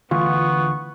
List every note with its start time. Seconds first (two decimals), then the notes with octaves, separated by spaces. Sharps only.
0.11 D2 E3 B3 F4 C#6